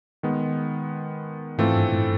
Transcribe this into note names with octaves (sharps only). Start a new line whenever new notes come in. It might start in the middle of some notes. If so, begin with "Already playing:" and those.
D#3 G#3 B3
G#2 E3 A3 C4 F4 A4
G2
A2